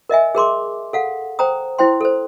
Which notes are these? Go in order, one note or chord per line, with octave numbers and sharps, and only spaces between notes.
A#4 D#5 E5 G#5
G#4 A#4 C6 D6
A4 F5 F#5
C5 G5 A#5 D#6
E4 C5 G5 C6
A4 C5